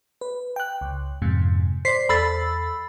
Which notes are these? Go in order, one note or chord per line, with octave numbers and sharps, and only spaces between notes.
B4
G5 F#6
C#2
F2 G#2 C3
C5 D5 B6 C7
E2 A4 B5 E6 A6 C7